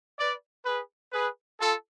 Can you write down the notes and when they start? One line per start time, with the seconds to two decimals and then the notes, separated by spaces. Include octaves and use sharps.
0.19 B4 D5
0.65 G#4 B4
1.12 G#4 B4
1.59 F4 A4